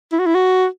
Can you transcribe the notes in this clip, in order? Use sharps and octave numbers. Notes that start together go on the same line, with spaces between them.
E4
F#4
E4
F#4